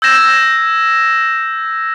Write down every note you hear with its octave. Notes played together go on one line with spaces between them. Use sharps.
E6 G6 G#6 A#6 E7